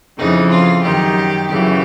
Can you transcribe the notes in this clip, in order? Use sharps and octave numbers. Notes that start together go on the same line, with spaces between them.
F2 C#3 E3 D#4
F4
F#2 D#3 G4
F#2 C#3 E3 G4